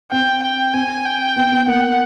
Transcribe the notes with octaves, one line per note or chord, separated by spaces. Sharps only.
C4 G5
G5
C4 G#5
G5
B3
B3
A#3 F#5